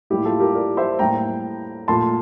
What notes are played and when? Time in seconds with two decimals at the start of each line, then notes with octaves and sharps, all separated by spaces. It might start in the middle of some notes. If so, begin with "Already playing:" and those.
0.10 A2 G3 A#3 E4 G4
0.25 F4 A4
0.40 G4 A#4
0.55 A#4 D5
0.77 C5 E5
0.99 A2 G3 A#3 G5 A#5
1.88 A#2 A3 A5 C6